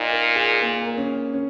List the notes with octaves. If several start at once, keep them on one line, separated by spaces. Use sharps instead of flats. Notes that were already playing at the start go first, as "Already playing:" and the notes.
Already playing: A#2 D#4
A#4
G#4
A#3
A#3
C#4
C#4